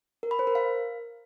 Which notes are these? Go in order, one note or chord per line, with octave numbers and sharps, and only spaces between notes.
A#4
B5
C5
A#4
F5